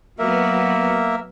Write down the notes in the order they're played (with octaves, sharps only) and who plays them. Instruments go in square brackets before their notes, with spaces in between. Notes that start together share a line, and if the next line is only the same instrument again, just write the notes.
[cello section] F#3 B3 F#4 [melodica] A#3 A#4 E5